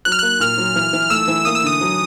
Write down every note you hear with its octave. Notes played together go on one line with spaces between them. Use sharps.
F#3 F#6
F6
A#3 F#6
A#2 F6
F#3
E3
E3
A3 E6
E3
A#3 D#6
E6
D3 D#6
F#3